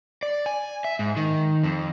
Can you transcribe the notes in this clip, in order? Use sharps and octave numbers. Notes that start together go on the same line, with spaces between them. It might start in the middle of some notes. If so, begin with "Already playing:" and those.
D5
G#5
E5
G#2
D#3
F2